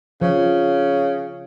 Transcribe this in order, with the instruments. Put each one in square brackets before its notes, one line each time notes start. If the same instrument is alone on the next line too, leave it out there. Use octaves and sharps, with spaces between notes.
[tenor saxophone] C#3 [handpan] F3